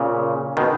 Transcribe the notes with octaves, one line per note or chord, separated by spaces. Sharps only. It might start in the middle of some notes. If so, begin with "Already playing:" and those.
Already playing: A#2 C#3
B2 D#3